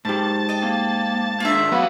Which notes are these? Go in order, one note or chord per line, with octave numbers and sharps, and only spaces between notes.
G#2 G4 A5
D#5 G5
A#3
A#3 D4 F4 G#4 E5
D3 D#3
F#3 A3 B3 F5